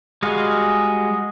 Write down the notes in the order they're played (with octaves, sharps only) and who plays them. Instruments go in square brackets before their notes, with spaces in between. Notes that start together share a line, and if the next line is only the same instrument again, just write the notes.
[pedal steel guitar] G3 G#3 F#4 G#4 F5